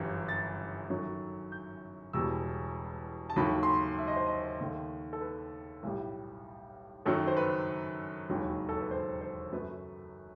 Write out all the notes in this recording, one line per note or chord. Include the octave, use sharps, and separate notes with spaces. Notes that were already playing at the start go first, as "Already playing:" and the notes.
Already playing: G1 F#2 E3 G3
A6
F#2 D#3 F#3 A3
G6
E1 E2 B2 G3 E6
A5
D#2 D#3 F#3 A3 B5
C6
B5
E5
D#5
C5
D#5
D#2 D#3 A3
A4
B4
B1 A2 G3
F#2 D#3 F#3 A4
C5
B4
E1 D#2 D#3 F#3
A4
B4
C5
C5
F#2 F#3 A3 B4